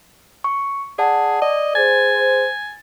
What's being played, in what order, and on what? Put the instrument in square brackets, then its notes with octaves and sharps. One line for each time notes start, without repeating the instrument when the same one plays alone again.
[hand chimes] C#6
[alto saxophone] G#4 [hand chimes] D5 F#5 A5
[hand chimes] D5 [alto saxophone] D#5
[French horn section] G#4 C5 [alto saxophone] G#5 [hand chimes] A6